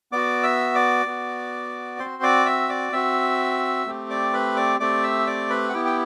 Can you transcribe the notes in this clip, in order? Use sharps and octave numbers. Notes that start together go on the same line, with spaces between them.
B3 F#4 D5 D6
E5 E6
D5 D6
B3 F#4
C4 F#4 C5 C6
D5 D6
E5 E6
D5 D6
C4 F#4 E5 E6
A3 C4 G4
D5 D6
B4 B5
D5 D6
A3 C4 G4 D5 D6
E5 E6
D5 D6
B4 B5
F#5
B3 E4 G4 G5
G5